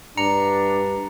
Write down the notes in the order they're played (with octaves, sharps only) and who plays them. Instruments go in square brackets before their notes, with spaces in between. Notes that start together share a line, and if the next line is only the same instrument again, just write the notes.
[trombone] G2 [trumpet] D4 [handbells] A#5 C#7